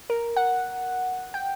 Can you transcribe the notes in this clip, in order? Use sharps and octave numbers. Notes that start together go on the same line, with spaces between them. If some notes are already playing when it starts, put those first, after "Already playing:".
A#4
F#5
G5